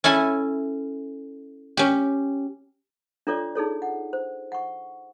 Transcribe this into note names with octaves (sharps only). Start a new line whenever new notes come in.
C#4 E4 A4 G#5
C#4 G4
D4 F4 A4 C#5 D5 D6
D#4 G#4 A4 C#5
F#5
C5
F#5 C#6